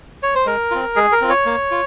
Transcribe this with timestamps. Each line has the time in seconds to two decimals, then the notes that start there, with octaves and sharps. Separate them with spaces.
0.23 C#5
0.35 C5
0.46 G#3 A#4
0.71 C4 F4
0.96 G#3 G#4
1.12 A#4
1.21 C4 F4
1.29 C#5
1.46 A#3
1.71 F4